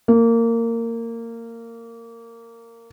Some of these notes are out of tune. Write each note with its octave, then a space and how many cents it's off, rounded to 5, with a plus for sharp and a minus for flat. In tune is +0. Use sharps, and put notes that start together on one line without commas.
A#3 -20